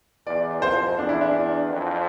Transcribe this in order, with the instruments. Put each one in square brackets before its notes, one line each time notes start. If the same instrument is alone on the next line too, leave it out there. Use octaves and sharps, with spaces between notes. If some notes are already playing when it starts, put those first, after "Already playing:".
[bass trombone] E2 [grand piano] D5
[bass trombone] F2 [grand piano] C5
[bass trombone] E2 [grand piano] D4
[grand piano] E4
D4
[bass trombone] F2